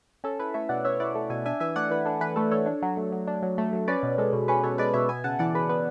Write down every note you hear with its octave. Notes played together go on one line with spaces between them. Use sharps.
C#4 A4
E4 B4
A3 C#5 E5
B2 D5 F#5
C#4 C#5 E5
E4 D5 F#5
A3
B2 E5 G#5
D4 E5 G#5
E3 E5 G#5
A3 D5 F#5
E3 B4
D4 A4
E3 B4
A3 A4
E3 A4 C#5
D4
F#3
A3
F#3
D4
F#3
A3
F#3
C#4 B4 D5
B2
G#3 A4
B2
C#4 B4
B2 A4 C#5
G#3 B4 D5
B2 C#5 E5
B3 E5 G#5
C#3 F#5 A5
E3 D5 F#5
C#3 B4
B3 B4